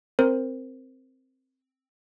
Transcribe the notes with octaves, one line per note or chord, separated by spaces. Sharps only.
C4 A#4 C5